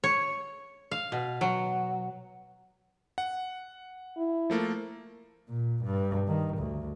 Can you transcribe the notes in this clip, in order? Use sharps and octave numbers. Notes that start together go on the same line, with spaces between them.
C#5
F5
B2
F#3
F#5
E4
F3 A3 A#3
A#2
G2
D#3
D2